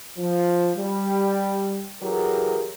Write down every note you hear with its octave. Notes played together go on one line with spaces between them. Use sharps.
F3
G3
E3 F#3 G4 G#4 A#4